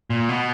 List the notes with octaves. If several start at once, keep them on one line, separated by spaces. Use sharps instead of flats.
A#2
B2